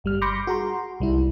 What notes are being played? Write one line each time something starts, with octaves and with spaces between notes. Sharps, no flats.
G1 G3 F6
B5 C6 D6 G6 A#6 C#7
F#4 G#4 A#5 C6
C2 G3 E4